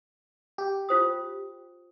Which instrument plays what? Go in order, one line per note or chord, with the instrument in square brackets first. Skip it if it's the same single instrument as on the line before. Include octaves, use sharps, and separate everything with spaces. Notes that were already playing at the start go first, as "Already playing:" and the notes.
[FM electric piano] G4
[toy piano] F4 C5 D#6